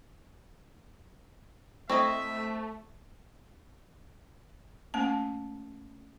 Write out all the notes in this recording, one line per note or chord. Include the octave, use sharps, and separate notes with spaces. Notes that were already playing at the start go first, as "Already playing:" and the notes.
A3 C4 E4 D#5 E5 C#6
A3 A#3 C#4 A5